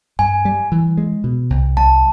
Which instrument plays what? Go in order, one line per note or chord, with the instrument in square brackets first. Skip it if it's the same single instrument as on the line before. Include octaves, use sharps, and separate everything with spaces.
[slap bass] G2 [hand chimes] G#5
[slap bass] G3
E3
G#3
B2
C2
[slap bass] C2 [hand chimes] A5